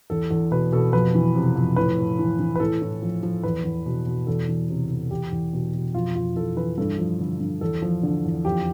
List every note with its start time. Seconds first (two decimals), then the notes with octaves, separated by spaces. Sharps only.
0.10 E2 A4
0.30 E2 A4
0.51 B2 B4
0.72 B2 A4
0.93 F2 B4
1.15 E3
1.35 C3
1.56 F2
1.76 A2 B4
1.98 A2
2.19 E3
2.40 E3
2.55 B4
2.60 A2 A4
2.82 A2
3.02 F3
3.23 F3
3.43 E2 B4
3.64 E2
3.86 B2
4.06 B2
4.27 E2 A4
4.48 E3
4.69 C3
4.89 E2
5.11 E2 G4
5.31 E2
5.53 B2
5.74 B2
5.94 F2 F4
6.15 F2 F4
6.36 E3 A4
6.57 E3 B4
6.78 G2 A4
6.99 F3
7.20 D3
7.40 G2
7.61 E2 A4
7.82 F3
8.03 D3
8.25 E2
8.45 F2 G4